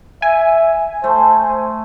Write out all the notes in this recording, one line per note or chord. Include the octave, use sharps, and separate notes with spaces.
E5 G#5
A3 C5